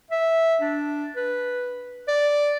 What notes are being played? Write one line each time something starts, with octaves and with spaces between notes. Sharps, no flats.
E5
D4
B4
D5